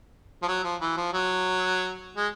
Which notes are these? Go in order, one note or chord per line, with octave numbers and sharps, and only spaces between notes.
F3
F#3
F3
E3
F3
F#3
G#3